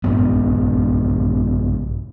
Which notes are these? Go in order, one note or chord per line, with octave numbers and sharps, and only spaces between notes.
A#1 G2 B3